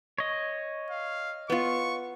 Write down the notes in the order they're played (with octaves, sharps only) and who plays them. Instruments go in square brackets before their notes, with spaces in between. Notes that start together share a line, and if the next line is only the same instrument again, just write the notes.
[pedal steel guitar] C#5 D#5
[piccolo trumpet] F5
[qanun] B3 F4 [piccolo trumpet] C#6